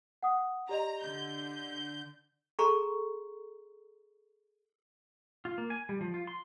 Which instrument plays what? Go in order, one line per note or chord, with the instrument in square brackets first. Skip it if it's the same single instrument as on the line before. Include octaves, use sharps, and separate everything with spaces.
[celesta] F#5 D#6
[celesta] G4 D5 D#5 [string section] A#5
[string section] D3 G6
[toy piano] G#4 A4 A#5 C6 C#6
[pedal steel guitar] F4
A#3
G#5
G3
F3
F4
C6